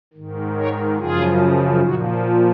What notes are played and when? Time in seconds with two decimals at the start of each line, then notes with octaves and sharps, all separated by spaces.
0.14 G#2 D#3
0.56 A#4 C#5
0.98 F#2 C#3 F3 F4 G#4
1.82 A#2 F3 D#4 F#4